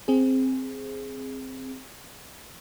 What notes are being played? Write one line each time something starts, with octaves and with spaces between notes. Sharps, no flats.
C4 G#4